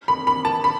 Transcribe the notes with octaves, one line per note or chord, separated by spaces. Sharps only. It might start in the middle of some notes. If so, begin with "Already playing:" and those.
B5
B5
A5
B5